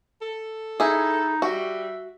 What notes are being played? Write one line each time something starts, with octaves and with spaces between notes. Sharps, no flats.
A4
D#4 E4 G#4
G3 F#4 E5